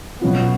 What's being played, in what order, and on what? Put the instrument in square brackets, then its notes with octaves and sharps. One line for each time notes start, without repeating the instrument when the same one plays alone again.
[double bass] B2 [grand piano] F#3 C#4 F4